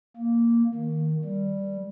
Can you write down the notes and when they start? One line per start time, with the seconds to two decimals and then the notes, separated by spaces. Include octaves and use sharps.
0.17 A#3
0.74 D#3
1.24 G3